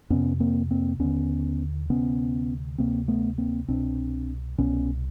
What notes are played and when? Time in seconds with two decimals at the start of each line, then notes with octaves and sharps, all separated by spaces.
0.10 F2 C3 B3 C#4
0.40 A#3 C4
0.71 A#3 C4
0.99 D#2 D3 B3 C#4
1.90 D2 C3 B3 C#4
2.78 D2 C3 A#3 C4
3.08 A3 B3
3.38 A#3 C4
3.68 C2 B2 C4 D4
4.58 C2 B2 B3 C#4